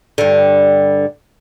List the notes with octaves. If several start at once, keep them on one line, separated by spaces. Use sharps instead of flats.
G2 D3